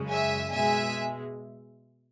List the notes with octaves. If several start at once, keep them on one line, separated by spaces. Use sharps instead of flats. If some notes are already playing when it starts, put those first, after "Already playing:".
Already playing: F#2 C#3 G#3
E5 G#5
B2 G#3 E5 G#5